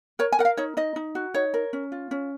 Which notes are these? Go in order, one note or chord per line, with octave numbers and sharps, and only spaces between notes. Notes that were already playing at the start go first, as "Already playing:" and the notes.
A#4 C#5
G#5
A#4 F#5
F5
D#4 C#5
D#4 D#5
D#4
F#4
D#4 C#5
A#4
C#4
F4
C#4